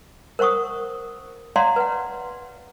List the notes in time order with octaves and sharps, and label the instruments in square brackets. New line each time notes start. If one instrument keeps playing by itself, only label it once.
[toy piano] A#4 C5 F#5 C#6 D#6
C#5 D5 F5 F#5 A#5 C6
B4 F#5